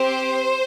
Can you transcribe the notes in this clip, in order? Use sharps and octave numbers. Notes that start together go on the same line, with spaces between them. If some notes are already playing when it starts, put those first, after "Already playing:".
Already playing: C4 G4 C5